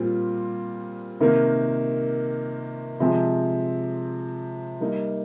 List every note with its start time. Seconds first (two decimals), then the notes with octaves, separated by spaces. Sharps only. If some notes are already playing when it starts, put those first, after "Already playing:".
Already playing: A#2 G3 C4 F4
1.20 C3 D#3 A#3
3.00 C3 F3 G#3 C4
4.81 G3 A#3 D#4